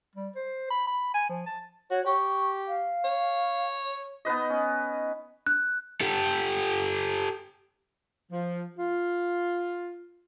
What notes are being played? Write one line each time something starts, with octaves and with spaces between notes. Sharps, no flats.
G3
C5
B5
B5
G#5
F3
A5
F#4 C#5
G4 C#6
F5
C#5
B3 D#4 B4 D#5
C#4
F#6
G4 A4
F3
F4